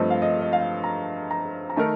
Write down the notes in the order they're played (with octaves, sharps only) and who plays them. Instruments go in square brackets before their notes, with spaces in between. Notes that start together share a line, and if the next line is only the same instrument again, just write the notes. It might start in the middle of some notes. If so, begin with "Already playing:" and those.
Already playing: [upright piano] G2 F3 A3 C4 [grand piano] D#5
[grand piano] F5
D#5
D#5
F5
A#5
A#5
A#5
[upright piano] D#3 A3 D#4 A#4 [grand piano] A5